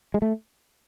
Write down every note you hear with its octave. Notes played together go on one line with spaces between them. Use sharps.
G#3
A3